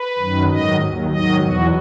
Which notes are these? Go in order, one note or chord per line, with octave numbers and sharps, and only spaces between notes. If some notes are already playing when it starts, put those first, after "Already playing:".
Already playing: B4
F#2 D#3 F#3
G#2 D#3 F#3 D#5
D#2 D#3 F#3
G#2 D#3 F#3 D#5
E2 B2 F#3 F#4